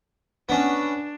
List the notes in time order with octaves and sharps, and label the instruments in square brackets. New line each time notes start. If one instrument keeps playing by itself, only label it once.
[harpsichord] B3 C#4 [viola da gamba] D4